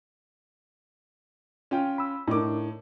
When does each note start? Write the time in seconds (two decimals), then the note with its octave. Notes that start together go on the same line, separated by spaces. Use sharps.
1.71 C#4 F4 G5
1.98 B5 E6
2.27 A2 D4 D#4 A#4 D6